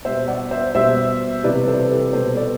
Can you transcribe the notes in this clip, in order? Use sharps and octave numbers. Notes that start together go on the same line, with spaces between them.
B2 G3 C5 E5
D5 F#5
C5 E5
B2 G3 C5 E5
C3 E3 G3 B4 D5
A4 C5
G4 B4
B2 G3 A4 C5
B4 D5